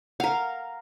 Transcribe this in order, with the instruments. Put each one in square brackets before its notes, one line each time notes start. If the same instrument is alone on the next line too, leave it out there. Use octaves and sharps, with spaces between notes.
[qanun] A#4 F5 [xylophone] F#5